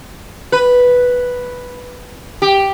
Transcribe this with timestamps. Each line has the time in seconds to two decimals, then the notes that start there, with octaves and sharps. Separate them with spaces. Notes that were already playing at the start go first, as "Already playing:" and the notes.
0.52 B4
2.42 G4